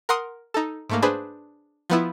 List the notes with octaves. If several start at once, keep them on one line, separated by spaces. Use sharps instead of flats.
A#4 F#5 C6 D#6
D#4 A4
G#2 A3 A#3
D4 G#4 B4 C5
F3 B3 E4